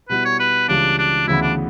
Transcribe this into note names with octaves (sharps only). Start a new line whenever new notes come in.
B2 G3 B3 E4 B4
C#5
B4
C#2 C#3 E3 G3 D4
D4
D2 C#3 E3 B3 E4
D4